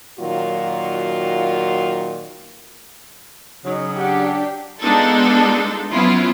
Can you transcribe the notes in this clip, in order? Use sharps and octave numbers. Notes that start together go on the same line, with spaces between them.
A#2 D#3 F#3 F4 F#4
C#3 F#3 D#4
D4 G4 F#5
G#3 B3 D4 D#4 F4 A4
F3 F#3 B3 C#4 E4 F4